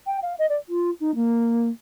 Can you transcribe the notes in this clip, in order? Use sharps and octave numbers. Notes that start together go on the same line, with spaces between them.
G5
F5
D#5
D5
F4
D#4
A#3